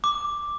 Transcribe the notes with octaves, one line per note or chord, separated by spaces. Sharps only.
D6